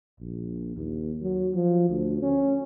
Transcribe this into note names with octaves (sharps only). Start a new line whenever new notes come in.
A#1
D#2
F#3
F3
D2
C#4